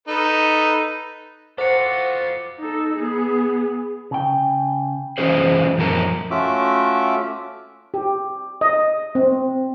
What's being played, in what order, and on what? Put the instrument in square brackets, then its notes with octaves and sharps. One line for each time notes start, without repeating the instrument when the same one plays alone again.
[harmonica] D#4 A4 B4
[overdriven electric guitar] F4 A4 [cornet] F#4 [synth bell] C5 [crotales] D6 A6 C#7
[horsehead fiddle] D#4 A4
B3 G#4
[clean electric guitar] C#3 G5
[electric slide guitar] E3 F3 C#4 F4 G#4 C5
F#2 F3 A#4 A5
[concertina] A3 C#4 F4 F#4 E5 D6
[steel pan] G4
D#5
C4